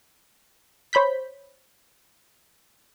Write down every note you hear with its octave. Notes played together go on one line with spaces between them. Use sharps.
C5 C#5 B5 G6 B6